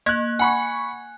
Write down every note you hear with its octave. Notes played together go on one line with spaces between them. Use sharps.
A#3 F#6 G#6
F#5 G#5 B5 C#6